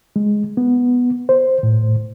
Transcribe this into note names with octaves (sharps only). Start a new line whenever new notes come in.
G#3
B3
C5
A2